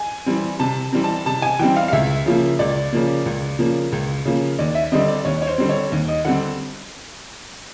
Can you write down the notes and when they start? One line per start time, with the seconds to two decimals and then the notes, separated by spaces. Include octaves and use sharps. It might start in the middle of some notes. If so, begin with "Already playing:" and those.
Already playing: G#5
0.26 E3 G3 C4
0.60 C3 A5
0.93 E3 G3 C4
1.04 A5
1.26 C3 A5
1.42 G#5
1.59 E3 G3 C4 G5
1.76 F5
1.88 F5
1.92 C#2 E5
2.26 C#3 F3 A#3
2.59 C#2 D5
2.93 C#3 F3 A#3
3.26 C#2
3.59 C#3 F3 A#3
3.92 C#2
4.25 C#3 F3 A#3
4.59 D#2 D5
4.75 E5
4.92 D3 G3 C4 D#5
5.08 D5
5.25 D#2 C#5
5.42 C#5
5.47 C5
5.58 D3 G3 C4
5.69 C#5
5.92 D#2
6.08 D#5
6.25 D3 G3 C4 F#5